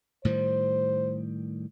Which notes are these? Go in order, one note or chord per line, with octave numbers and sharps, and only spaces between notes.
A2 D#3 G3 C5